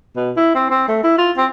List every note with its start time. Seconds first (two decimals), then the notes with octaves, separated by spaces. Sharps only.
0.16 B2
0.37 E4
0.55 C4
0.70 C4
0.88 A3
1.03 E4
1.18 F4
1.37 C4